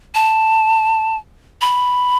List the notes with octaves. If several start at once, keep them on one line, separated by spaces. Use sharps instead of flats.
A5
B5